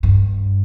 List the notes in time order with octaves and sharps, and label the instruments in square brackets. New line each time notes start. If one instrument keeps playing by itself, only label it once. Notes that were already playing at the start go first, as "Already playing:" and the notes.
[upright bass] G2